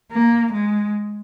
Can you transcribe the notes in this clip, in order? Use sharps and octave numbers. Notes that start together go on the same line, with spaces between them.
A#3
G#3